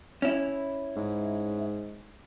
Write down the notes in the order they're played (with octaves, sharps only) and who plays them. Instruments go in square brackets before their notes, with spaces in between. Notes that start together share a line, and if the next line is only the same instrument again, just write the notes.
[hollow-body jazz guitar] C#4 E4
[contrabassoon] G#2